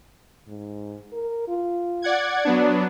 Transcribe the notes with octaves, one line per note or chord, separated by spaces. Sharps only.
G#2
A#4
F4
D5 F#5 G#6
F#3 B3 D4 D5